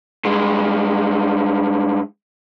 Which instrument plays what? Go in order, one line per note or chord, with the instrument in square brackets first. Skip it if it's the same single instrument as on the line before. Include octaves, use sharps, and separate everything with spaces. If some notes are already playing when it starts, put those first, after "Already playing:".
[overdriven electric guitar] G2 G#3